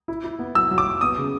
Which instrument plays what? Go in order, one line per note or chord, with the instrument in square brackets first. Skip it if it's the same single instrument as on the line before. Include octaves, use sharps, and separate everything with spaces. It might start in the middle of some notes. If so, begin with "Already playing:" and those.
[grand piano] E4
E4
B3
F#3 E6
F#3
D6
F#3
B3 D#6
C#3